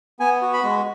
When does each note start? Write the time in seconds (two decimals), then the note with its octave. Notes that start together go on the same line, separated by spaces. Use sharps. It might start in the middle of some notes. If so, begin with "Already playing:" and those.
0.20 B3 G#5
0.42 F#4
0.53 B5
0.64 G#3